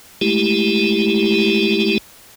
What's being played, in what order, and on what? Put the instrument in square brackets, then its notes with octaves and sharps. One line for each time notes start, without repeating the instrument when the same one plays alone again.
[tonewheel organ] G#3 A3 E4 G4